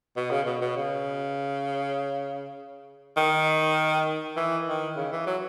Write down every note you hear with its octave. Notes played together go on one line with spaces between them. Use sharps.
B2
C#3
B2
B2
C#3
D#3
E3
D#3
C#3
E3
F#3